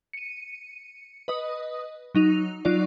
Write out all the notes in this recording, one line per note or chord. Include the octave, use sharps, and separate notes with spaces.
C#7 D#7
B4 D#5 D#6
F#3 D#4 F7
F#3 D#4 F4 D5